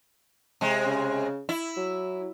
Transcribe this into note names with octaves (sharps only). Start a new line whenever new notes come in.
C3 G#3
C#3
E4
F#3